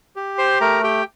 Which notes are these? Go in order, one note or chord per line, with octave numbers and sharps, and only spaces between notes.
G4
C5 C6
A3 A#4 A#5
G4 G5